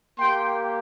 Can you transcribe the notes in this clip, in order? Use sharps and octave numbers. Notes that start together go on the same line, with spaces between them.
A#3 G4 G5 C6